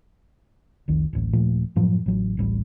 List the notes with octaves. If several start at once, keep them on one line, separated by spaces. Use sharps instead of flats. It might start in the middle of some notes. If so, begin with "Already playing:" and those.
F1 C2 D#3
D1 A1
D#1 A#2 F3 A3
F#2 A2 F3 F#3
A1 F#3
D1 A1 G3